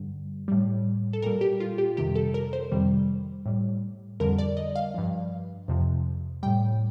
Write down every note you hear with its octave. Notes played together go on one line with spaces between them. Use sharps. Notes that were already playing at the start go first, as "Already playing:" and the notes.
Already playing: G2 D3 G3
A2 G3
A4
A#2 G3 A#4
G4
F4
G4
F2 C3 D#3 G3 G4
A4
A#4
C5
F2 C3 D#3 G3
A2 G3
F2 D3 G3 A#4
D5
D#5
F5
G2 F3
F2 C3 F3
A2 G3 G5